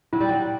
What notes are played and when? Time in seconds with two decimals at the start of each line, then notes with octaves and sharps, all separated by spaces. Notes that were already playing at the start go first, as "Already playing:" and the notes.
0.13 F#3 E4
0.20 G3
0.29 F#3